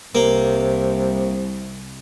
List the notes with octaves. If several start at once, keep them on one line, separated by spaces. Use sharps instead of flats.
C2 C3 A#3